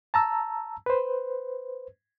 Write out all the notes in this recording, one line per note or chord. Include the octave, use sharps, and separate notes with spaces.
A5 A#5 E6
B4 C5